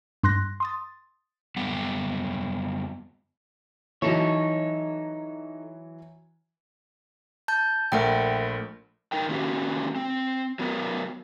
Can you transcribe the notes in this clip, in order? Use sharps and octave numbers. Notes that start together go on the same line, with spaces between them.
G2 C6 F#6 A#6
C6 D#6 A6
F#2 G3 B3 F#5
E3 F#3 D#4 A4 C#5
A5 G6
A#1 A3 A#4 E5 F#5 G5
G2 D#4 A#4 G5
D#3 A3 A#3 C#4 F#4 G4
C4
F#3 B3 A#4